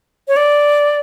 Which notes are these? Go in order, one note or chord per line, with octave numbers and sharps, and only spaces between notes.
C#5
D5